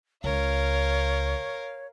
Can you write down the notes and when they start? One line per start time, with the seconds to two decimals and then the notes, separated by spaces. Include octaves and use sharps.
0.24 C#2 A#4 C#5 F5